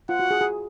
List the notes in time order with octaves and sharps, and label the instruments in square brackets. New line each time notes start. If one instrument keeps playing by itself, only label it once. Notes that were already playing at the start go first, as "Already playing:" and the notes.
[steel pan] F4 [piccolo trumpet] F#5
[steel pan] F#4
G#4
G#4